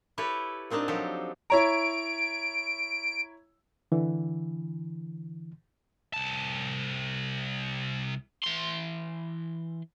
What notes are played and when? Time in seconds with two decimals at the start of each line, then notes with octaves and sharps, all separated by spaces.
0.18 E4 G4 A4 B4 C#5
0.70 A#2 C4 D4 D#4 A5
0.88 F3 F#3 G4 A4
1.50 E4 C#5 A#5 D7
3.92 D3 E3
6.14 C2 A5
8.44 E3 C6